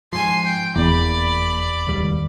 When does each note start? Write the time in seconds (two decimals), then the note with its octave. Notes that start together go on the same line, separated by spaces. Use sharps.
0.13 G#2 F3 G#5 C6
0.45 G5
0.76 F1 E2 A#3 D5 B5
1.87 D1 C#2 D#3 G3